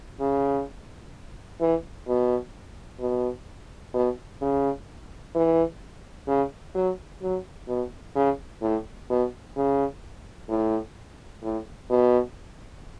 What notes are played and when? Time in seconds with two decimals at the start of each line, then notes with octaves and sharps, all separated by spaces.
0.20 C#3
1.61 E3
2.08 B2
3.00 B2
3.94 B2
4.42 C#3
5.35 E3
6.28 C#3
6.75 F#3
7.22 F#3
7.68 B2
8.15 C#3
8.62 A2
9.10 B2
9.56 C#3
10.49 A2
11.43 A2
11.90 B2